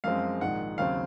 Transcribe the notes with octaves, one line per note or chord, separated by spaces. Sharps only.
F#2 F3 G#3 C4 F5
A#1 G#2 D#3 F#5
D#2 C#3 F#3 C4 F5